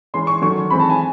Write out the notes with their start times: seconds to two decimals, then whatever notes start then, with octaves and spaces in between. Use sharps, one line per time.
0.14 E3 G#3 C#4 C6
0.27 C#6
0.42 D#3 F#3 A3 C#6
0.70 E3 G#3 C4 B5
0.80 A5
0.90 G#5